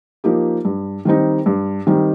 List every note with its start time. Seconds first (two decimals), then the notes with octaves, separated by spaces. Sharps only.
0.24 F3 A#3 D#4 G4
0.65 G2
1.05 D#3 G3 C4 D#4
1.46 G2
1.87 D#3 G3 C4 D#4